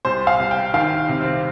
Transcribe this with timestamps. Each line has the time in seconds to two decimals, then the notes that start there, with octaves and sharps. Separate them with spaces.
0.05 C2 C5
0.27 F5
0.39 C2
0.51 G5
0.74 D#3 F5
1.08 C3
1.21 C4